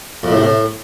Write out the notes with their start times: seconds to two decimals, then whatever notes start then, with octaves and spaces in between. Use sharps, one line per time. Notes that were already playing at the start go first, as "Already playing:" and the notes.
0.23 F2
0.30 A2
0.36 C3
0.43 A2